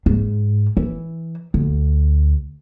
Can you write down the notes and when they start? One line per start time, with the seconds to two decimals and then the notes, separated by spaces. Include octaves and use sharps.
0.06 G#2
0.77 E3
1.54 D2